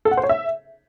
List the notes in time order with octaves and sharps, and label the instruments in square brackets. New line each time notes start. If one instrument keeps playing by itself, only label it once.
[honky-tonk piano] A4
F#5
C5
C#5
E5